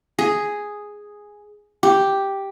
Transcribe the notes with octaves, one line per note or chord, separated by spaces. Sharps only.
G#4
G4